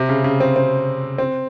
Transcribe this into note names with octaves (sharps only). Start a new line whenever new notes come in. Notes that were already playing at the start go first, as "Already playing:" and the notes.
Already playing: C3
C#3
C#3
C4
C4
C4